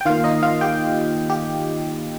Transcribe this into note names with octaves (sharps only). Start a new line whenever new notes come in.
G5
D#3 A#3 F4 F5
D#4 D#5
F4 F5
G4 G5
G4